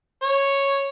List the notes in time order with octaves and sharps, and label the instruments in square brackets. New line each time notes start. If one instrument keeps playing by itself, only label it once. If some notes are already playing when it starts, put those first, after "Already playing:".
[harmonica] C#5